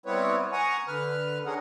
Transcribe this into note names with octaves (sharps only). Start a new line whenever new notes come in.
G3 B3 C4 E4 B4 C#5
F#5 G#5 A#5 C#6 D#6
D3 B4 F6
C#4 D4 G#4 A#4 F#5